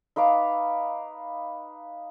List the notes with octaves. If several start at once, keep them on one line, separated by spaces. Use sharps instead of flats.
D#4 B4 F5 D6